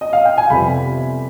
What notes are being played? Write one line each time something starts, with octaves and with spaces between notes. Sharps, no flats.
D#5
F5
G5
G#5
F2 C3 G3 B3 B5